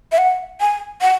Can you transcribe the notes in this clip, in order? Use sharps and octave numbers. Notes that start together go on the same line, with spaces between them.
E5
F#5
G#5
F#5